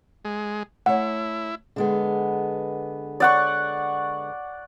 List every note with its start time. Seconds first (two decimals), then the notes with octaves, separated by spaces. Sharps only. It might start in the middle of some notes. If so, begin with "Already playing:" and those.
0.25 G#3
0.86 A3 E4 C#5 F#5
1.76 D3 G#3 B3
3.20 D5 F#5 C#6